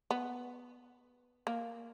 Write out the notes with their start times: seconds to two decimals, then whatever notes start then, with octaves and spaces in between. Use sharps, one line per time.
0.11 B3
1.47 A#3